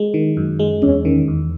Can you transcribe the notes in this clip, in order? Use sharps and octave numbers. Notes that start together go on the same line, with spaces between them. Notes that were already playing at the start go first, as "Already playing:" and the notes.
Already playing: G#3
D#3
F#2
G#3
E2 C#4
D#3
E2